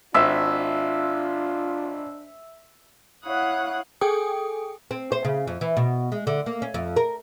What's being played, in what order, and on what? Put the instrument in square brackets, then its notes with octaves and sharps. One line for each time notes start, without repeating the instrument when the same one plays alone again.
[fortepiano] G#1 [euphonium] D4 [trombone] F4 [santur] E5
[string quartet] E4 C#5 F5 F#5 D#6 F#6
[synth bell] G#4 A4 G5 G#5 D#6
[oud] C4
C5
C#3
F2
E3
B2
G#3
D3
A#3
C#4
F2
A#4